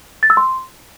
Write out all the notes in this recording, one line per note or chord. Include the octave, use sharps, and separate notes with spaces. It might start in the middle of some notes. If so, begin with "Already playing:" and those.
A6
E6
C6